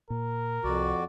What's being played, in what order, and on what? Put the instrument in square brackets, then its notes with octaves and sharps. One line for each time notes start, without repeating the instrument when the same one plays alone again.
[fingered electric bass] A#2 [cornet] A#4
[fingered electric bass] C2 [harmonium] F2 F#4 D5